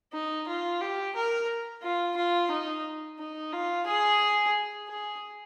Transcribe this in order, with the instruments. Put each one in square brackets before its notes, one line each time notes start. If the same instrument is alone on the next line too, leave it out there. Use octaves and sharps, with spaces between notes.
[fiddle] D#4
F4
G4
A#4
F4
F4
D#4
D#4
F4
G#4
G#4